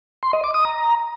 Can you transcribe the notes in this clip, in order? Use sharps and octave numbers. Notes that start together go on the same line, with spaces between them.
C6
D#5
D6
D#6
A#5